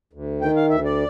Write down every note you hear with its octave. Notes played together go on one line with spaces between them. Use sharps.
D2
D#3 G5
F5
D2 E5
D5